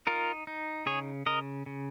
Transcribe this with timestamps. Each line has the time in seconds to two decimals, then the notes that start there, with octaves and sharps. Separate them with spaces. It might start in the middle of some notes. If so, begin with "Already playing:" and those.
0.07 D#4 F4 A#4
0.47 D#4
0.86 C#3 G#4 C#5
1.26 C#3 A#4 D#5
1.66 C#3